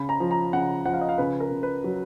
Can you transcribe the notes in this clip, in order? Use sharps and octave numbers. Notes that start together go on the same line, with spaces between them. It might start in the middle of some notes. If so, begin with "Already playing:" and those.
Already playing: C#3 B5
A#5
F3
A#5
C#3 F#5
F3 F#5
F5
D#5
F5
C#3 B4
A#4
C#3
B4
F#3